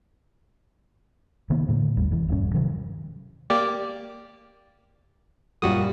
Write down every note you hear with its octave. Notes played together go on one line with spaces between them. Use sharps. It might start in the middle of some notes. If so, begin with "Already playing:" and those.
C3 D#3 A#3 B3
A2 D3 A3
G#1 D#2 G3
F1 E3
D#1 G2 C#4
C3 D#3 F3 F#3
A#3 G4 D5
F#2 A#2 G3 F#4 D#6